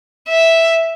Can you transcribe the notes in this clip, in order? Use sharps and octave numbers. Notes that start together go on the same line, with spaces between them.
E5